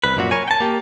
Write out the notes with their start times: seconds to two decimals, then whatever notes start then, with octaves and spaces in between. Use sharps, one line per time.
0.04 C2 B4
0.17 F#2 A#2 F#4
0.31 A#4 C#5 G#5
0.48 G5 A5
0.60 A#3 G4